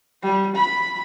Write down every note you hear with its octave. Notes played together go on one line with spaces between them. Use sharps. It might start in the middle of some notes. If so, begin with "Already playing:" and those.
G3
B5